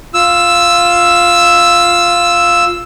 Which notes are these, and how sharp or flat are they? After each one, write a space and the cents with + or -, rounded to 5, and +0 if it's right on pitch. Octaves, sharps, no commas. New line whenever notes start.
F4 +0 E6 +5